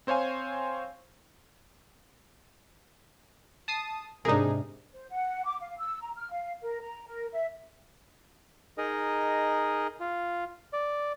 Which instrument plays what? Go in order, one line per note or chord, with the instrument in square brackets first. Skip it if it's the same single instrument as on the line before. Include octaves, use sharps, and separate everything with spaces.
[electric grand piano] C4 C5 C#5 F5 G#5
[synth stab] A5 D#6 C7
[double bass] G#2 C3 [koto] D4 A#4 [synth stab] D#4 G#4
[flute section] C5
F#5
D6
F5
E6
A#5
F6
F5
A#4
A#5
A#4
E5
[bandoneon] D#4 G#4 A#4 D#5
F4
D5